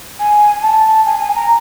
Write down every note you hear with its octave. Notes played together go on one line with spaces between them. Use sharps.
G#5
A5
G#5
G#5
A#5